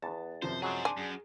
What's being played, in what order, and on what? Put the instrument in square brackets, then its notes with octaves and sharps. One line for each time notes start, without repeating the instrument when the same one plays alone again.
[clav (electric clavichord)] E2 A5 [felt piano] B3 A6
[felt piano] F#2 C3 F3 [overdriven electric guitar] C5
[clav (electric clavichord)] F#3 G#3 [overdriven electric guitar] G#4 C5
[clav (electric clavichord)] D4 [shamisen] G#5 [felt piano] C6
[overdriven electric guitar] F#2 [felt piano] G#4